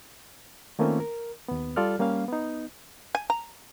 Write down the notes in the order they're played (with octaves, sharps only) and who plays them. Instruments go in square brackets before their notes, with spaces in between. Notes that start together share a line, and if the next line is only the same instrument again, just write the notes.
[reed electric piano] D#3 A3 A#3 C4 C#4 F4
A#4
D#2 B3
G3 F4 A4 D5 F6
G3 A#3 C#4 F5
B3 D#4
[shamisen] G#5
A#5